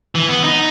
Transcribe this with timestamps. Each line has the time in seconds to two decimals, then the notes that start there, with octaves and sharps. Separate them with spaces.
0.15 E3
0.29 B3
0.44 D#4